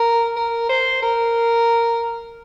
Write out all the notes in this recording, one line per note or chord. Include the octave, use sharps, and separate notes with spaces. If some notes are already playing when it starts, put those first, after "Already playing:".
Already playing: A#4
A#4
C5
A#4